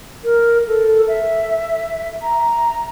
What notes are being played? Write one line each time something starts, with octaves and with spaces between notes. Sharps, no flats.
A#4
A4
E5
A#5